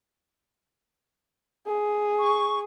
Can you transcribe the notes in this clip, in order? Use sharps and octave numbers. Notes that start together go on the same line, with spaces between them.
G#4
C#6